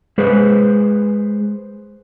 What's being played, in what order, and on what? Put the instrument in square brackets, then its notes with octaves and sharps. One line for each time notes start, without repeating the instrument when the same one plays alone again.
[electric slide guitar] G#3 G#4 B4 C5